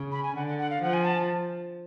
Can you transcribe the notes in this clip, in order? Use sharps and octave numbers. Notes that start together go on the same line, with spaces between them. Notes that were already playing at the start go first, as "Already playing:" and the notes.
Already playing: C#3
B5
G#5
D3 F#5
F#5
F#5
F5
F3 F#5
G#5
A5